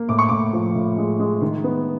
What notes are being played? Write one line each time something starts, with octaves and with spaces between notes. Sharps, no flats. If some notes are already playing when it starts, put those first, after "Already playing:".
Already playing: A#3
A2 D6
C#6
A2 D6
F3
A2
G#3
G#3
D#3
B3